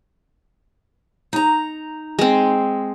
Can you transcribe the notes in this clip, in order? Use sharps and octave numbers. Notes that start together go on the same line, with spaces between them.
D#4 A#5
G#3 C4